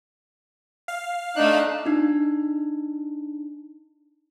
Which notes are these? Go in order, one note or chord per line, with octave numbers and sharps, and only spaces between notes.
F5
A3 D4 D#4 F#6
D4 D#4